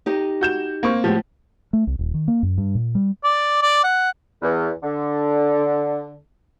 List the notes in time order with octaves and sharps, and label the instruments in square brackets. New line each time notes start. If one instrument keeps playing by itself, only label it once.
[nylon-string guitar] D#4 G4 D#5
[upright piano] F#4 G6 E7
A#3 C4 C#6
[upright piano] A2 F3 [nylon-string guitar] G#3 B3 G4
[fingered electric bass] A3
C2
D#1
D#3
A#3
F#2
G2
A#2
G3
[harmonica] D5
D5
F#5
[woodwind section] E2
D3